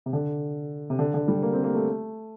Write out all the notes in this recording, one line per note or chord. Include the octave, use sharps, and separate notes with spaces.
C3
D3
C3
D3
D3
G3
A#3
C4
A#3
A3